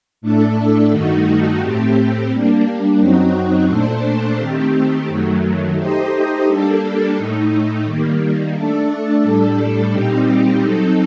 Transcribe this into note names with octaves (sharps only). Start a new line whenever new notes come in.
A2 A3 D4 A4
G2 D#3 A3 D#4 F#4
A2 A3 C4 G4
G3 A#3 D4
F#2 F#3 C4 D#4 F#4
A#2 A3 D4 A4 C5
D#3 A3 C4 G4
F#2 D#3 F#3 A3
A3 D#4 G4 C5 D#5
G3 A#3 D4 A4
A2 A3 D#4
D#3 G3 A#3
A3 D4 A4
A2 G3 D4 A4
A#2 G3 C4 D#4 G4
F#3 C4 D#4 A4